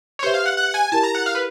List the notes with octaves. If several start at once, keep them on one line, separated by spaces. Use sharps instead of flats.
C#5
G4 B4 C5 E5
F5
F#5
F#5
G#5
E4 G4 A#4 A5
A#5
F#5
F5
B4